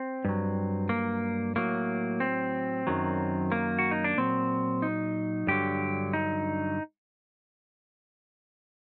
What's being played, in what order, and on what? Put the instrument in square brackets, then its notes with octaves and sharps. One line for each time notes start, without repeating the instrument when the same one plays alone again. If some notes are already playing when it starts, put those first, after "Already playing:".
Already playing: [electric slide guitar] C4
G2 F#3
A#3
A2 F#3 A#3
C4
F#2 D#3 F#3
A#3
F#4
D#4
D4
A#2 F#3 C4
D#4
G2 D3 F#3 G4
D#4